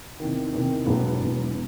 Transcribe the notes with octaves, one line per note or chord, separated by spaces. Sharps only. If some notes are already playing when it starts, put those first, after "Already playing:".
E2 C3 D#3
E2 C3 D#3
E1 E2 B2 F#3 B3
E1 E2 B2 F#3 B3
B2